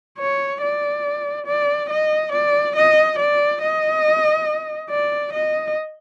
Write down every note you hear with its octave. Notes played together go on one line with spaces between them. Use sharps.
C#5
D5
D5
D#5
D5
D#5
D5
D#5
D5
D#5